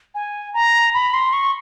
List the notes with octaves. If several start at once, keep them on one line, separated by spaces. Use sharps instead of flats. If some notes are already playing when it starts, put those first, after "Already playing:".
G#5
A#5
B5
C6
C#6